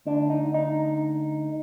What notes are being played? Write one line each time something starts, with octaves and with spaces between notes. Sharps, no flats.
D2 D3 D4
D#4
D#4